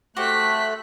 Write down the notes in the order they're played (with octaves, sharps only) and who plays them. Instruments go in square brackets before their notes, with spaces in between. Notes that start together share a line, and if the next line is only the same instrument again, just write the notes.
[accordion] A3 [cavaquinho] F#4 G4 C5 [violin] F#6 B6